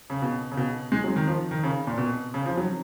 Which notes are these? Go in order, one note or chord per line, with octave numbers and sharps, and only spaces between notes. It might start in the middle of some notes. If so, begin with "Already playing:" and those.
C#3
B2
C#3
B2
G#3
F#3
D#3
F3
D#3
C#3
A#2
B2
C#3
F3
F#3